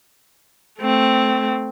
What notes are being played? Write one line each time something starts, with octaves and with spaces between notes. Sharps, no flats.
A3 C4